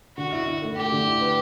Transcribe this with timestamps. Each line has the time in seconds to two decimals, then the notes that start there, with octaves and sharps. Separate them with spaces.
0.17 D3 F#4
0.32 E4
0.47 E4
0.62 A3
0.76 A3 G4
0.92 D3
1.06 E4
1.21 B4